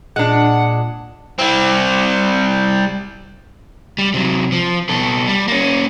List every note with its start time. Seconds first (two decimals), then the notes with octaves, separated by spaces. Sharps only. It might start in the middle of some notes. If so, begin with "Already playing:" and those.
0.16 A#2 G#3 D4 F#5
1.39 G3 C4
3.98 G3
4.14 C3 F#3
4.52 F3
4.89 B2 A4
5.27 G3
5.48 A#3 C#4